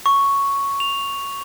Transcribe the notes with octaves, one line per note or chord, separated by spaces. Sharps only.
C#6
F7